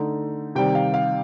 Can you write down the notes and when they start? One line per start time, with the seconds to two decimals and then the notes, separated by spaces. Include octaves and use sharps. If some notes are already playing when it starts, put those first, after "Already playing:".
Already playing: D3 A3 D#4
0.55 C3 D#3 G3 G5
0.75 F5
0.94 F5